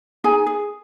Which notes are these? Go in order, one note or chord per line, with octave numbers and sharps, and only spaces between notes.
D#4 G#4 G#5
G#4